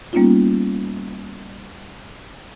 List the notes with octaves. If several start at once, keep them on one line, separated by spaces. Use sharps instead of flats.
G3 A#3 B3 C#4 D#4 F4